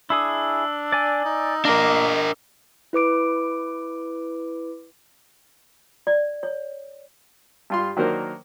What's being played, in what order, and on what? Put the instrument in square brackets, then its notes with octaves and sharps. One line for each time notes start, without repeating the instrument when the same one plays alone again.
[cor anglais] D4 [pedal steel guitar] E4 G#4 D#6 [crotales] E6
[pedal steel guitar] D5 G#5
[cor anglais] D#4
[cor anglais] A#3 [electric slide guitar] D4 A#4 [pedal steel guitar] D#5 [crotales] D6 G7
[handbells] E4 B4 D6 D7
[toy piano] D5
C#5
[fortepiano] G2 F4 C6
D#3 F#3 A#3 D4 A#4 C5